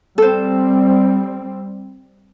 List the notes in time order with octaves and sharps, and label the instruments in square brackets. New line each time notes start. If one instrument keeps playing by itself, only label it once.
[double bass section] G3 C4 [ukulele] A4 C5